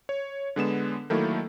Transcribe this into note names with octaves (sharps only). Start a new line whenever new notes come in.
C#5
D3 G#3 B3 E7
D#3 F#3 A3 A#3 E4 A4